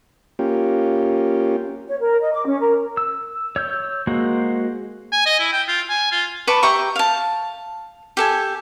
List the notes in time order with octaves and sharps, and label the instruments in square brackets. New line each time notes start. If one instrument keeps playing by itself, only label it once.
[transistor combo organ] A#3 C#4 F4 G4
[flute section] C#5
A#4
D#5
D6
C#4
A#4
[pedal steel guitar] E6
C#5 E6 G6
G#3 A#3 F#4 C5
[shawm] G#5
D#5
E4
G5
F4
G#5
F4
[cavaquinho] B4 A5 C#6 D6
G4 E5 A#5 C#6
F5 A5
G4 A4 G#5